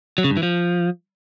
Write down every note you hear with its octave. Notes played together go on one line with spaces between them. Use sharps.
F#3
C#3
G2
E3
F3